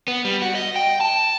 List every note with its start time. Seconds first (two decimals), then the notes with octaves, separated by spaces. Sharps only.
0.08 B3
0.25 G3
0.42 F#4
0.55 D#5
0.76 G5
1.01 A5